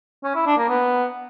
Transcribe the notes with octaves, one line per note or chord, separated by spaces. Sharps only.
C#4
E4
D4
A#3
B3